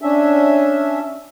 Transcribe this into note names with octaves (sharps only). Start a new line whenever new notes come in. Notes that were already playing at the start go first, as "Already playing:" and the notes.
C#4 D4 E5